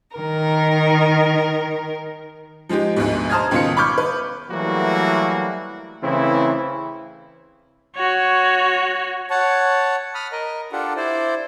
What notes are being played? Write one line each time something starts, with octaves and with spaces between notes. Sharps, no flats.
D#3 A#4
F3 G#3 D#4 G4
D2 G#2 B2
C5 A5 A#5 D#6 F6 G#6
C#2 B2 D#3 F4 C#7
B5 C#6 D6 F6 G6
B4
E3 F#3 G3 A3 A#3 F#4
C#3 E3 A3 C4 E4
F#4 C#5
C#5 F#5 A5
B5 D#6 F6
A#4 D#5
D4 F4 G4 A4 F#5
E4 C5 D5